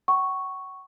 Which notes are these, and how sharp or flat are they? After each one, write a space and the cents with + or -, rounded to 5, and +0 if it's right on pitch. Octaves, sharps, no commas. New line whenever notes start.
F#5 +45 C#6 +0